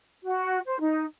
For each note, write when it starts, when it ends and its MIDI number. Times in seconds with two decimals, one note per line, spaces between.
0.24 0.58 66
0.66 0.79 72
0.80 1.05 63